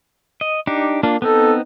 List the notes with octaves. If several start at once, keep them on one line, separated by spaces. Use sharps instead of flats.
D#5
D4 D#4 G4
A#3 D4 F4
B3 C4 D#4 A4